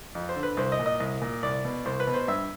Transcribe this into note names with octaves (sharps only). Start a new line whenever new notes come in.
F2
C5
D3
B4
C2 C5
D#5
A#2
D#5
C2
A#2
C2 D5
B2
C2 C5
B4
B2
C5
G2 E5